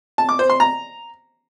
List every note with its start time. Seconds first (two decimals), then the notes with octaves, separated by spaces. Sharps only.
0.18 A5
0.29 D6
0.39 C5
0.50 C6
0.60 A#5